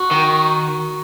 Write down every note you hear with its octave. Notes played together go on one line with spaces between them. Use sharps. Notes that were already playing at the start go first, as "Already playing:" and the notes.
Already playing: F#4
D#3